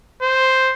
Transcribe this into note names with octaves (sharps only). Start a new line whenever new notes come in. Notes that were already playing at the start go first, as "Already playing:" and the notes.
C5